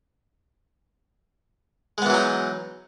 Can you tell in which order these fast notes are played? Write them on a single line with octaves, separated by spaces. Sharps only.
G#3 B3 E3 F#3 D#4